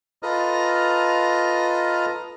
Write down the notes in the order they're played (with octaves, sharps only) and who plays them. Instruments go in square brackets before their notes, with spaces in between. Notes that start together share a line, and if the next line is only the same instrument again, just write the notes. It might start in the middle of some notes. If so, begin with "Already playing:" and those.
[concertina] F4 A4 B4 D#5 A#5 F6